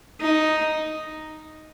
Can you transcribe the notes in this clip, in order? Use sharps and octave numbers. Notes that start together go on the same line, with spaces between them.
D#4